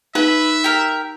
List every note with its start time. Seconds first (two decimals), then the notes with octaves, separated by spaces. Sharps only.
0.15 D#4 B4 E5
0.64 G4 A#4